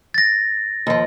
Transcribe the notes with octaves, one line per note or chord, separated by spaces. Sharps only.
A6 A#6
D#2 F3